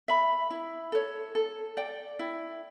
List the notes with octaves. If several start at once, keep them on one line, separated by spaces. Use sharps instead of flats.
E5 B5
E4
A4 C#5
A4
D5 G5
E4